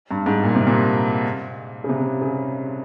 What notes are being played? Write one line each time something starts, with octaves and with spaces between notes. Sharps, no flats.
G2
G#2
A#2
C3
A#2
C#3
C3
C#3